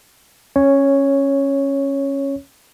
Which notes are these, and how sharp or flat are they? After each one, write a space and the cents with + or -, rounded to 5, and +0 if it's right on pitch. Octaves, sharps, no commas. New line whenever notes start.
C#4 -15 C#5 +0